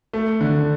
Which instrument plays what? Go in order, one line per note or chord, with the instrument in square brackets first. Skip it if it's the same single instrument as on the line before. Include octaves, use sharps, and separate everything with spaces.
[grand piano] A3
D3